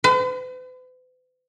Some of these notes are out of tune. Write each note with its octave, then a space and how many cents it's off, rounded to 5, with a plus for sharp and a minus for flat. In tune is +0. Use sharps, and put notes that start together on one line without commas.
B4 +45